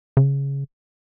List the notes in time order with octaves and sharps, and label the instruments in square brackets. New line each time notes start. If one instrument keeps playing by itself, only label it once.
[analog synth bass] C#3